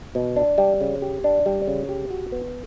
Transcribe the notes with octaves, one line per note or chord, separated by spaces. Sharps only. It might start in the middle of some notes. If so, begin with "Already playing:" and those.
B2
D4
G3
C#3
G4
D4
G3
C#3
G4
F#4
B3